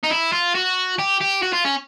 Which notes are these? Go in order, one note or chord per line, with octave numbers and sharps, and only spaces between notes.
D#4
E4
F4
F#4
G4
G4
F#4
F4
C#4